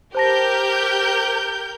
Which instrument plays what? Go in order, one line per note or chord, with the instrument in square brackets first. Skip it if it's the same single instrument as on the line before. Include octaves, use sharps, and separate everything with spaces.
[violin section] G4 A#4 G6 [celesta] C5 A5 A#6